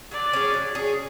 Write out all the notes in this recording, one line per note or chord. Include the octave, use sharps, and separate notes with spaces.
F#3 D5
C#4 G#4
F#3
C#4 G#4